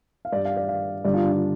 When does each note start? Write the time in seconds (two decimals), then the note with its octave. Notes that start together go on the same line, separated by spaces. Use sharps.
0.25 F5
0.32 G2 G3 D5
0.45 F5
0.57 D5
0.68 F5
1.05 G2 D3 G3 D5
1.14 F4
1.23 D4
1.32 F4